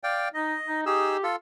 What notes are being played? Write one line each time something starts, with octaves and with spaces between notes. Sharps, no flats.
D5 F5 G5
D#4 D#5
D#4
D#4 G4 G#4 E6
F4 A4